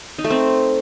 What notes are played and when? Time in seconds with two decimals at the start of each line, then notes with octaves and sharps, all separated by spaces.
0.19 D#4
0.24 A3
0.30 C4